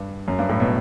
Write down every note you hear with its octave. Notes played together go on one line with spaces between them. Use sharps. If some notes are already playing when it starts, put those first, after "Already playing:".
Already playing: G2
F#2
G2
A2
B2